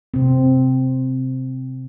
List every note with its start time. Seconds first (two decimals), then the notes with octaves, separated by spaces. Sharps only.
0.14 C3 C4